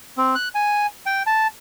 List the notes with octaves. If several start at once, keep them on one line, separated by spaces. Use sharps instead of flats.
C4
F#6
G#5
G5
A5